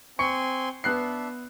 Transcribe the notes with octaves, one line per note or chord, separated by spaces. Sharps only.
C4 G#5 C6 C#6 C#7
B3 D4 E5 F#6 C7